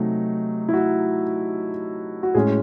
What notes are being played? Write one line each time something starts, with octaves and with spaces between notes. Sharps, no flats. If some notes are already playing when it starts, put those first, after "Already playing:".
Already playing: C3 F#3 A3 D#4
E4
F#4
F#4
A2 G#3 C#4 G#4